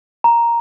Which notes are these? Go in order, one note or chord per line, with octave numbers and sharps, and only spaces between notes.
A#5